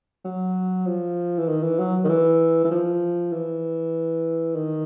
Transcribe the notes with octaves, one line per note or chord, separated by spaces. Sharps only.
F#3
F3
E3
D#3
E3
F#3
D#3
E3
E3
F3
E3
D#3